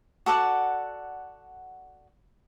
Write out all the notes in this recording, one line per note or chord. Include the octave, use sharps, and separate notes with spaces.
F#4 A4 D5 F#5